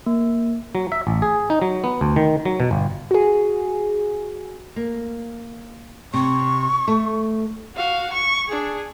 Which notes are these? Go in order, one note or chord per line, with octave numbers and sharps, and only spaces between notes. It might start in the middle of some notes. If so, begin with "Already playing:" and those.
A#3
F#3
E5
A1
G#4
D#4
F#3
B3
D2
D#3
F#3
B2
G1
F#4 G#4
A#3
C3 C#6
A3
F#4 F5
C#6
D4 G#4